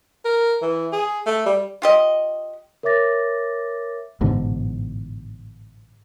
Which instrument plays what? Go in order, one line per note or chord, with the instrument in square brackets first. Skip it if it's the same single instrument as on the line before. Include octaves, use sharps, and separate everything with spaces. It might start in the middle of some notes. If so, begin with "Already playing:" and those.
[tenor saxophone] A#4
E3
G#4
A3
G3
[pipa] F4 G4 D#5
[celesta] A#4 C#5 E5 D6 A6 A#6
[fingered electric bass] A1 G#2 B2 D3